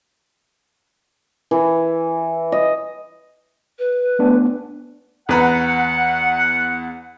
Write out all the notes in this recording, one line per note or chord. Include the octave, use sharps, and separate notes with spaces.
E3
D#5
B4
A3 B3 D4
E2 B4 F#5 A#5